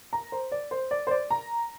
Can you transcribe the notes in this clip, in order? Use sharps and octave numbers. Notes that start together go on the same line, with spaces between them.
A#5
C5
D5
C5
D5
C5
D5
A#5